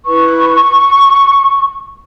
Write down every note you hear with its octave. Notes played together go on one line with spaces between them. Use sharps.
E4 B4 C#6